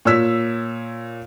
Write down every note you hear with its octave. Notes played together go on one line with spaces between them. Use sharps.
A#2 C#5 E6 B6